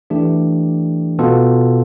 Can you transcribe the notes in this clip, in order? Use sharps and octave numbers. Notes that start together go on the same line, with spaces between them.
E3 A3 D4 G4
B2 B3 F4 A4